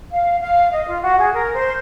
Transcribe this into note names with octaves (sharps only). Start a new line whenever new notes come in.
F5
F5
D#5
F4
F#4
G#4
A#4
C5